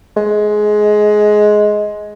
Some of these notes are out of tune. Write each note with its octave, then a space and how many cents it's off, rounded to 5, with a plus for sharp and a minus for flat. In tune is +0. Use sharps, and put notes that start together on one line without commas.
G#3 +15